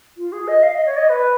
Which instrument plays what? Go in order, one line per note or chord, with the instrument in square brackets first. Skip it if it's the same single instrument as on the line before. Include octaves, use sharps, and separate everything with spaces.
[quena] F4
G#4
D#5
F5
D#5
C#5
D#5
B4